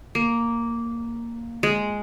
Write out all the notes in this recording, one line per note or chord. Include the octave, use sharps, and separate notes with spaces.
A#3
G#3